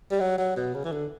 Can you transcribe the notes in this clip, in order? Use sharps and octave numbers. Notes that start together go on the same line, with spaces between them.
G3
F#3
F#3
B2
C#3
E3
D3